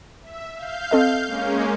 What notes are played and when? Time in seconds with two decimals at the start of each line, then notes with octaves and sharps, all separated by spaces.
0.22 E5
0.54 F5 G6
0.91 C4 A4 D#5
1.27 G#3 A#3 C#4